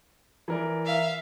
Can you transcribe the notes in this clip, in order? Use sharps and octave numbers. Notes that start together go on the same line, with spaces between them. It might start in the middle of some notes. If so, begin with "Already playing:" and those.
E3 A#4 D5
E5 F5